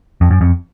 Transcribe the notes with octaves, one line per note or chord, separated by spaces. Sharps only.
F2
F#2
F2